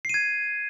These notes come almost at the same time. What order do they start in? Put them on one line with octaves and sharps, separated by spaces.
C7 D#7 G#6